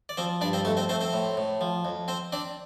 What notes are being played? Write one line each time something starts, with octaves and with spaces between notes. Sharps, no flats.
D5
F3 C4 C5
G2 D4 D5
C4 C5
F2 A3 A4
C4 C5
A3 C4 C5
C4 C5
A2
A2
F3
F2
C4 C5
C4 D4 D5